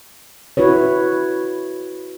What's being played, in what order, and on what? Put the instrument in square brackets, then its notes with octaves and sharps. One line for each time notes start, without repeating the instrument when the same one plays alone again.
[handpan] E4 F#4 B4 C#5